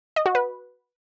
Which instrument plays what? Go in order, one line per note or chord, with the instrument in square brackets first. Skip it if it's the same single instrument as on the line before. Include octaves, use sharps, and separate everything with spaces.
[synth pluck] D#5
F#4
B4